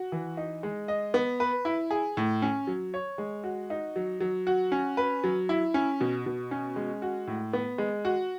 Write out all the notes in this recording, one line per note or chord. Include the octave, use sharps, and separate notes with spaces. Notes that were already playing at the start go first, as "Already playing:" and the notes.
Already playing: F#4
E3
D#4
G#3
D#5
B3
B4
E4
G#4
A2
C#4
F#3
C#5
G#3
F#4
D#4
F#3
F#3
F#4
C#4
B4
F#3
E4
C#4
B2
B2
C#4
G#3
F#4
A2
B3
G#3
F#4